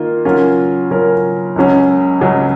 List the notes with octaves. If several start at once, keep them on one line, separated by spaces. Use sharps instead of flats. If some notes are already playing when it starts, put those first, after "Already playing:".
Already playing: D#3 A#3 F4
C#3 F#3 C#4 F4 A#4
C#3 F#3 C#4 F4 A#4
C#2 C#3 F#3 C#4
C#2 C#3 F#3 C#4